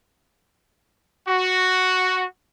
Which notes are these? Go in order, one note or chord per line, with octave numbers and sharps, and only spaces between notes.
F#4